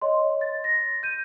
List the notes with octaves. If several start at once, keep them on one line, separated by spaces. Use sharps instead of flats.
C#5 D#5 C6
A6
A#6
G6 D#7